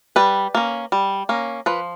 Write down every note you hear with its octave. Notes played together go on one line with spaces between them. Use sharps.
G3 B4
A#3 C#4
G3
A#3 C#4
F3 B4